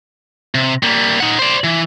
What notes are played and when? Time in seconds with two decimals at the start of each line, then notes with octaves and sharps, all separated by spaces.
0.55 C3
0.83 G3 A#3
1.20 D#4 F#5
1.39 C5 D5
1.64 E3